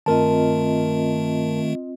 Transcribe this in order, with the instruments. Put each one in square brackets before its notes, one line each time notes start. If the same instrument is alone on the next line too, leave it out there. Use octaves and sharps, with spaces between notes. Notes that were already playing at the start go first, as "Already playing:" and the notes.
[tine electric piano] G2 A#4 A5 [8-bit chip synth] D#3 A3 [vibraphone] C4 F4 D#5